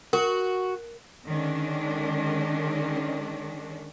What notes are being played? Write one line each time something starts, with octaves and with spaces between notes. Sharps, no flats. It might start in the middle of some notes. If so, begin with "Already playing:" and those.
F#4 A#4
D3 D#3 G#3 C#4 D4